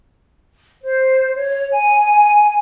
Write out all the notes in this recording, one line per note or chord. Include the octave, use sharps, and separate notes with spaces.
C5
C#5
G#5